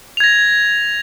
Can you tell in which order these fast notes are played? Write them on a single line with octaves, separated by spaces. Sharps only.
F7 G#6 A#6